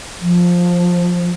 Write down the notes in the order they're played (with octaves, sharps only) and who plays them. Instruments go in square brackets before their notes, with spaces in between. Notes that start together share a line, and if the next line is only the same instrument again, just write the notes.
[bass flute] F3